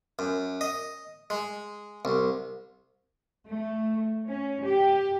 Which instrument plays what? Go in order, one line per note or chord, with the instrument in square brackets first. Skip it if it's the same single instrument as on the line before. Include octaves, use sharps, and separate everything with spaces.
[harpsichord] F#2
D#5
G#3
C2
[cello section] A3
C#4
G4